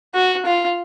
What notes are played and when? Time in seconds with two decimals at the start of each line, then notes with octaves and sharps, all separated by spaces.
0.15 F#4
0.46 F4